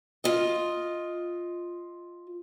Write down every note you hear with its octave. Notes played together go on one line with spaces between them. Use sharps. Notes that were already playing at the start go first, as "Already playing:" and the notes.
F4 D#5